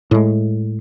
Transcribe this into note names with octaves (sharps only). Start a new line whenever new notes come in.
A2 G#3